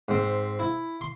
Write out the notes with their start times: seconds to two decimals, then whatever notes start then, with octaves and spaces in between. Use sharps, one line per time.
0.08 G#2 C4
0.59 E4
1.01 C6